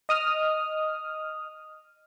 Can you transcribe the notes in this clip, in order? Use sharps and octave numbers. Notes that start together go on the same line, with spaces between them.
D#5 D#6 F6